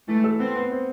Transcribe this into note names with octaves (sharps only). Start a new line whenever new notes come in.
E3 A3
A4
B3 C4
B3
C4